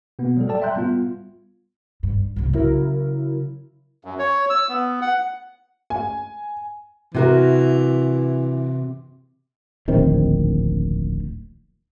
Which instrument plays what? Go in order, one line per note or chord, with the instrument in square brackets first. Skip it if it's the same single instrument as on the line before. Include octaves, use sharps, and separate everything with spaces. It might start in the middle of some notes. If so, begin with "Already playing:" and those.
[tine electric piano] B2 A#3 B3
F#3 G3 A4
A4 C#5 D5 G5 A5
E5 G5 A#5 C6 F#6 G6
G3 B3 F4
[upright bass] G2
C2 G#2
[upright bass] C#3 [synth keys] F#3 E4 A#4
[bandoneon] F#2
C#5
E6
B3
F#5
[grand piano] G#5
[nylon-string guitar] C3 F#4 A#4 [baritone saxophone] E3
[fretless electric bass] D1 A#1 D#3 C4